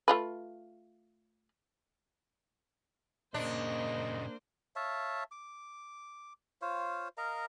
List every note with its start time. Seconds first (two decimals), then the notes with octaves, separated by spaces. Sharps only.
0.08 A3 F4 B4
3.34 A#2 C#3 A#3 D4 C5 D#5
4.76 C#5 E5 F5 A5
5.31 D6
6.62 F4 C5 C#5 F5
7.17 A#4 D#5 F5 A#5